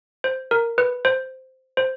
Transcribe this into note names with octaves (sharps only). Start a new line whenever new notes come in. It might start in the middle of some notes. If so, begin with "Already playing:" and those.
C5
A#4
B4
C5
C5